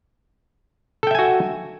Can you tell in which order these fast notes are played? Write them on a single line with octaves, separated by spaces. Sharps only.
A4 G5 E5 G#5 F#4